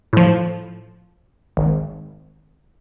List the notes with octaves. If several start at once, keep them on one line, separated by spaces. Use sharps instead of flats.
A2 F3
G#1